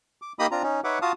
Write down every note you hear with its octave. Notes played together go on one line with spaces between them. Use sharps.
D6
A#3 D#4 G4 D#5 B5 D#6
C4 D4 F4 A#5
C#4 D#4
D#4 B4 C#5 E5 F#5 D6
F4 F#4 F5 A5 D#6